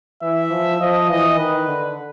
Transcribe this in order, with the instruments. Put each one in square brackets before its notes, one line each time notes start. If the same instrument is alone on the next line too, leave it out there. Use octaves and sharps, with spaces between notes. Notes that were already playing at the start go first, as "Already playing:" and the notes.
[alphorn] E3 [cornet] E5
[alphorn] F3
[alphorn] F3 [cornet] D#5
[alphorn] E3 [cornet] D#5
[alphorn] D#3 [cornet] B4
[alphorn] D3